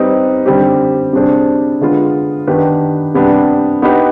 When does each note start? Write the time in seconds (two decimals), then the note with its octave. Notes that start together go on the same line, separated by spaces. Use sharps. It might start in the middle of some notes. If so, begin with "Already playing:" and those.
Already playing: G3 C4 D#4 B4
0.46 D3 G3 C4 G4
1.13 C3 G3 D4 G#4 C5
1.81 D3 G#3 B3 F4
2.47 D#3 B3 D4 G4 B4
3.14 C3 G3 B3 D4 G4
3.82 B3 D#4 G4 B4